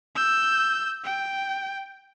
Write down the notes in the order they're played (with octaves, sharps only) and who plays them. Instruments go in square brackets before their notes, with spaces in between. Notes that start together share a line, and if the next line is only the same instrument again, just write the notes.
[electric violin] E6 G6
G5